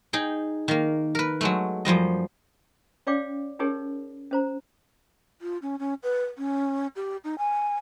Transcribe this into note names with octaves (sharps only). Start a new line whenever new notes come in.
D#4 G#4 G5
D#3 A#3
A#4 B4
F#3 G#3 A3
F#2 F3 G3 D#5
C#4 C#5 D5 F5 G5 D6
C#4 D#4 G4 G#4 A#4 C#5
C#4 C5 A#5
F4
C#4
C#4
B4
C#4
G4
D#4
G#5